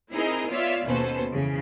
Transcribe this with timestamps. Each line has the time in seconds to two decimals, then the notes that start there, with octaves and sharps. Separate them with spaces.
0.12 C4 D#4 E4 G#4 A#4 D#5
0.50 B3 F4 C#5 D5 E5 F5
0.85 D#2 B2 C#4 A4 B4 C5
1.30 F2 C#3 E3